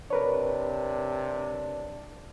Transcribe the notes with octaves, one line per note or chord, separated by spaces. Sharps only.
C3 D4 A#4 B4 C#5